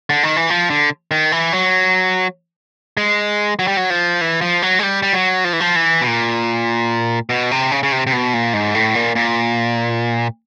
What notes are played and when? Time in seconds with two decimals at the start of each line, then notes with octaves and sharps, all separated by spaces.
0.10 D3
0.23 D#3
0.36 E3
0.50 F3
0.70 D3
1.11 D#3
1.32 E3
1.53 F#3
2.97 G#3
3.59 F#3
3.67 G3
3.77 F#3
3.90 F3
4.21 E3
4.41 F3
4.62 F#3
4.79 G#3
4.83 G3
5.02 G3
5.13 F#3
5.44 F3
5.53 E3
5.60 F3
5.76 E3
6.01 B2
6.07 A#2
7.30 B2
7.51 C3
7.71 C#3
7.83 C#3
7.92 C3
8.07 C3
8.12 B2
8.34 A#2
8.54 G#2
8.74 A2
8.95 A#2
9.15 A#2